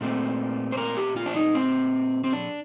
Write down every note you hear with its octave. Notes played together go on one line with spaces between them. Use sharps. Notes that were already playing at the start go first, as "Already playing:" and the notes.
A#2 A3 C4
C5
A#4
G4
F4
D4
D#4
C4
C4
D4